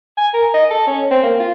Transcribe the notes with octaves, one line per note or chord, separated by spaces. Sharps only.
G#5
A#4
D#5
A4
C#4
C4
A#3
F4